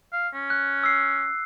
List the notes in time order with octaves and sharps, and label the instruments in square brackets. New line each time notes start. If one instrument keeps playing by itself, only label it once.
[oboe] F5
C#4
[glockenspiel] F#6
E6 C7